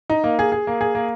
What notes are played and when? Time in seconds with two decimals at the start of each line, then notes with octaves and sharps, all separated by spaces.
0.10 D#4
0.24 A#3
0.39 G#4
0.52 G#4
0.67 A#3
0.81 G#4
0.95 A#3